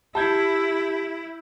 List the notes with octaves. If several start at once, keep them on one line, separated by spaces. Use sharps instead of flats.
E4 G4 A5 B5 G6 G#6